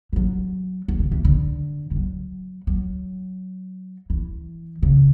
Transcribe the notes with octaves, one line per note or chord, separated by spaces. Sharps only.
E3
F#3
F#3
D3
E3
D3
E3
F#3
F#3
E3
C#3